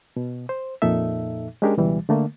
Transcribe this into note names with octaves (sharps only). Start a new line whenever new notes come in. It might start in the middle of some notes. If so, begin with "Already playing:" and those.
B2
C5
F2 A#2 D#4 A4 E5
G#3 C#4 D4 G4 G#4 A#4
C#2 B2 E3 G3
D3 A3 A#3